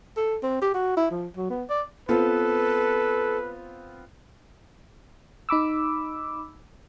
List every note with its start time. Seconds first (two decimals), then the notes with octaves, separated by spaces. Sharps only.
0.17 A4
0.43 C4
0.61 G4
0.74 F#4
0.96 E4
1.11 F3
1.37 F#3
1.50 B3
1.69 D5
2.09 B3 C4 F4 A4 B4
5.49 D#4 B5 D6 E6